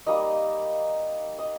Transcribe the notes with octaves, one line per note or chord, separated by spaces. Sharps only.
G3 A#3 D#4 D#5
D#5